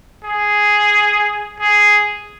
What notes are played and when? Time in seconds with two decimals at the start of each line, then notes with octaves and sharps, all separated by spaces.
0.24 G#4
1.60 G#4